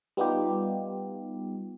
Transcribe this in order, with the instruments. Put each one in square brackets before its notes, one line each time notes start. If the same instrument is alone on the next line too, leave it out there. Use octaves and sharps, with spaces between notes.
[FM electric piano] G3 B3 D#4 F4 G4